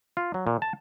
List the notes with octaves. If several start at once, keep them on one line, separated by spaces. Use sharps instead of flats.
F4
F#3
A#2
A5